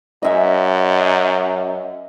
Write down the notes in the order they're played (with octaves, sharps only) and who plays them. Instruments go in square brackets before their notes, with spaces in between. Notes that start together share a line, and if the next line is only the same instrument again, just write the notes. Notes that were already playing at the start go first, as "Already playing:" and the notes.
[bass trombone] F#2 [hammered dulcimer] D#5 E5 G#5